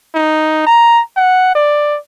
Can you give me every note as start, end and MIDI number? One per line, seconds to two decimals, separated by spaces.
0.15 0.63 63
0.67 1.01 82
1.17 1.55 78
1.55 1.98 74